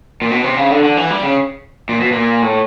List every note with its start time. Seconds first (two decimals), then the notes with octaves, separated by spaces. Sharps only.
0.22 A#2
0.31 B2
0.44 C3
0.57 C#3
0.71 D3
0.84 D3
0.97 E3
1.10 G3
1.23 C#3
1.89 A#2
2.00 B2
2.12 A#2
2.42 A2